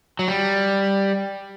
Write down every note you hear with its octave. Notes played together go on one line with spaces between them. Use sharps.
F#3
G3